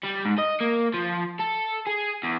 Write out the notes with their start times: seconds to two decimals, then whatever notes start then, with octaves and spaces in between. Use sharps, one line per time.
0.03 G3
0.25 G#2
0.38 D#5
0.61 A#3
0.94 F3
1.39 A4
1.87 G#4
2.24 E2